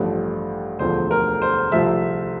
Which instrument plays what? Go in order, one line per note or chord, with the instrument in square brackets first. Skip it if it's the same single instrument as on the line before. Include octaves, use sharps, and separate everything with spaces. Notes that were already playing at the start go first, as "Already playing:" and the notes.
Already playing: [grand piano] A1 G2 F3 A3
E1 D2 D3 F3 A3 C5
A#4
C5
C2 C3 F3 A3 E5